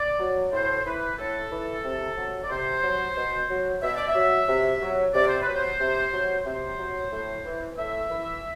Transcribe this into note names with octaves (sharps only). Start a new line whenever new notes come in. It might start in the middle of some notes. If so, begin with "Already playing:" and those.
Already playing: D5
F#3
A2 C5
E3 B4
A2 A4
E3
C3
F#3
D5
C3 C5
F#3
B2
F#3
B2 E5
D5
E5
F#3
C3
F#3
C3 D5
C5
B4
F#3
C5
C3
F#3
C3 C5
F#3
A2
E3
A2 E5
E3